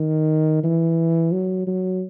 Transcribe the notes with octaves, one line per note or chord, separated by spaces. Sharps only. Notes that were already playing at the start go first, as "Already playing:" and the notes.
Already playing: D#3
E3
F#3
F#3